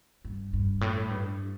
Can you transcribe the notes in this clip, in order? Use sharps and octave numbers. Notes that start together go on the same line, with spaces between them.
G2
G2
A2
G2